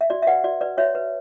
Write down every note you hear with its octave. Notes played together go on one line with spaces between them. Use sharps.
E5
F#4 D5
E5
B4 D5 F#5
F#4 D5
B4 D5
F#4 C#5 E5
B4